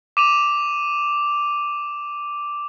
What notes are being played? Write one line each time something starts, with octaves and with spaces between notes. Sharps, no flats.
D6 D#7 F7